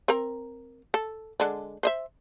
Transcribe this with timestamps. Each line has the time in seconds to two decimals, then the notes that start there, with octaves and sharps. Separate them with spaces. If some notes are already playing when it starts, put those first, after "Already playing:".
0.08 C4 A#4 A#5
0.94 A4
1.40 D3 G#3 D4
1.83 C5 D#5 E5